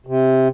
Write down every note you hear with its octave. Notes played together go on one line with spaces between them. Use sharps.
C3